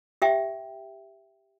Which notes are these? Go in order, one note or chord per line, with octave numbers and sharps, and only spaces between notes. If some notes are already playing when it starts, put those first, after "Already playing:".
G4 E5 G5